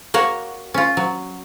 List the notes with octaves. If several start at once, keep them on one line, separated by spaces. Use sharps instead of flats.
A#3 F#4 C#5
C#4 F4
F#3